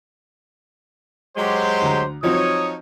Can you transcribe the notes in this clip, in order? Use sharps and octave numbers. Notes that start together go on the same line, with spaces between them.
F#3 G#3 G4 C5
D2 A#5
F3 F#3 C4 D#4 C#5 D#6